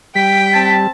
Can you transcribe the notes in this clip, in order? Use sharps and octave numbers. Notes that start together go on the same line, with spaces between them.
G3 G5 B6
C4 A5